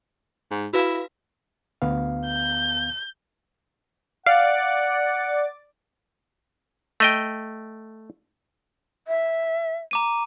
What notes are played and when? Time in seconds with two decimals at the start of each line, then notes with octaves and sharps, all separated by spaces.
0.51 G#2
0.73 E4 F#4 B4 F5
1.82 D2 B3 F5
2.26 G6
4.26 D5 F5 F#5
7.00 A3 D#5 G5
9.08 E5
9.91 A#5 D6 D#7